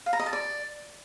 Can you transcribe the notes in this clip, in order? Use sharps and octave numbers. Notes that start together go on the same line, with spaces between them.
F5
A#5
D#5
A5
D5